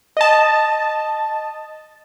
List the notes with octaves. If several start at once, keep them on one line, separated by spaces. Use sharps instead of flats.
D#5 A5